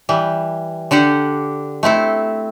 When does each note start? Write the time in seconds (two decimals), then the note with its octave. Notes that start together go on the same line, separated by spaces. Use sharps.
0.09 E3 G3
0.91 D3 D4 G4 F#5
1.83 A3 C4 E4 A4